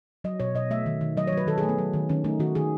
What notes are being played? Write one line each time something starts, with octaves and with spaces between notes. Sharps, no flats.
F#3 D#5
B2 C#5
B2 D#5
A3 E5
D#3
D#3
F#3 D#5
C#5
F#3
B4
D#3 A4
G#4
A3
B3
F#3
D#3
D#3 C#4
A3 D#4
D#3 F#4
D#3 G#4